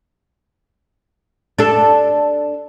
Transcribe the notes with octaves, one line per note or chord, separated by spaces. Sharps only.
D4 A4